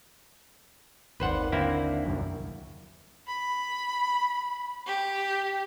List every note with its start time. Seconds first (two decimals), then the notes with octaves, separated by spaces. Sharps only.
1.20 G#1 D#2 B4 C5 D5 F#5
1.52 D3 A#3 C4 E4
2.06 C2 F#2
3.27 B5
4.85 G4